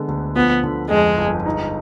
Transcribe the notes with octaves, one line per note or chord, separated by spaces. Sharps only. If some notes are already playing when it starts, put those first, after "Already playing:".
Already playing: D3 G#3 B3
D2
F3 B3
D3
F2 G#3
G1
D#4